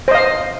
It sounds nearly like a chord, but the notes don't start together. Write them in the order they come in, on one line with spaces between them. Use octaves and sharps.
C5 D#5 F5